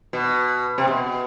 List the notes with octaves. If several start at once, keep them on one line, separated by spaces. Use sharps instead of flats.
B2
C3
B2